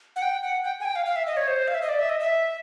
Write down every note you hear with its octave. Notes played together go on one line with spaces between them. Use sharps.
F#5
G5
F#5
G5
G#5
G5
F5
F5
E5
D#5
C#5
C5
F5
E5
D#5
D5
E5
D#5
E5